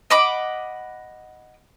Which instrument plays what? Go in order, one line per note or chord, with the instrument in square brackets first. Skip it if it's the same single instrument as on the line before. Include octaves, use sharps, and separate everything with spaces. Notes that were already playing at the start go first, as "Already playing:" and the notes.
[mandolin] D#5 F#5 B5 D6